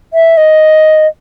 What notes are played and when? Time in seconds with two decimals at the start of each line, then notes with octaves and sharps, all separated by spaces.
0.14 E5
0.37 D#5